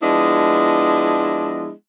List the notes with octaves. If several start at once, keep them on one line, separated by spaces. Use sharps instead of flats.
F3 G#3 B3 D4 E4 D#5